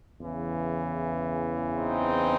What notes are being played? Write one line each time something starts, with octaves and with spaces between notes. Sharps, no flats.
E2 C#3 E3
C4 D#4